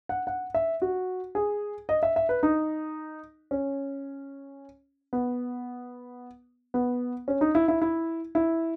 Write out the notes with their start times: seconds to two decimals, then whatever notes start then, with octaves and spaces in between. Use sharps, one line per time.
0.09 F#5
0.27 F#5
0.54 E5
0.82 F#4
1.35 G#4
1.89 D#5
2.03 E5
2.16 E5
2.29 B4
2.43 D#4
3.51 C#4
5.13 B3
6.74 B3
7.28 C#4
7.41 D#4
7.55 E4
7.68 E4
7.82 E4
8.35 E4